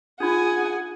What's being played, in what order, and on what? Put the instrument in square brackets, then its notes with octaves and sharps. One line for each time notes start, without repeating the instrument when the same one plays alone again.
[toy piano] D4 D#4 F4 [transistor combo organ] G#4 D#6 [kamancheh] F#5 G#5